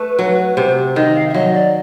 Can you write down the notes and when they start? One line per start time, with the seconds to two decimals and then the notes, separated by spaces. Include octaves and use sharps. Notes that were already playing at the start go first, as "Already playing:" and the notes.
Already playing: A3 B4
0.19 F#3
0.57 C3 C5
0.96 D#3 D#5
1.15 F5
1.29 E5
1.34 F#3 D#5
1.54 D5